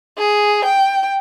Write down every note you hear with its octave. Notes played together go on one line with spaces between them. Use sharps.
G#4
G5